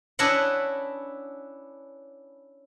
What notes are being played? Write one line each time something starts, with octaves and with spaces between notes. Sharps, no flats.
C#4 D4 E4 B4 D#5 F#5